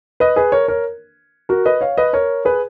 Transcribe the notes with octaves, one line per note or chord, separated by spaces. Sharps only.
B4 D#5
G#4 B4
A#4 C#5
A#4 C#5
F#4 A#4
B4 D#5
C#5 F5
B4 D#5
A#4 C#5
G#4 B4